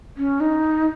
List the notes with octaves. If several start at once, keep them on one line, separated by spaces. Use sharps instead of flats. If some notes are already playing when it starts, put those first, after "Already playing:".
C#4
D#4